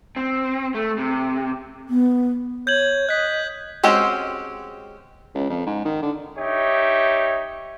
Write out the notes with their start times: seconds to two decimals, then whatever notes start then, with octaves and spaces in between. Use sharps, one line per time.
0.16 C4
0.74 A3
0.98 C3
1.89 B3
2.67 C#5 G6 G#6 F#7
3.09 D#5 F#6 B6
3.84 G#3 C4 C#4 F#4 G4
5.34 C#2
5.50 F2
5.66 G#2
5.85 D#3
6.02 D3
6.38 D#4 G4 C#5 E5